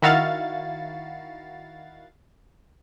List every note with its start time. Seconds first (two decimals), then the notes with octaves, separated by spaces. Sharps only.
0.02 D#3 E4 F#4 F5 A6